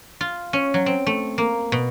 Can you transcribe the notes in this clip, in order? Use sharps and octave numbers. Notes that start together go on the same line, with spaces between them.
F4
C#4
F#3
C4
A3
A#3
B2